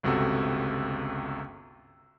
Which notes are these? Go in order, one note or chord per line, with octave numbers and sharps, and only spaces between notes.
G1 C#2 C3 F#4 A4 E6